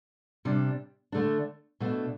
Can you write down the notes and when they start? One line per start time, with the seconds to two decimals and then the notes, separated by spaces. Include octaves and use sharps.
0.45 C3 G3 D4
1.12 D3 A3 D4
1.80 B2 A3 D4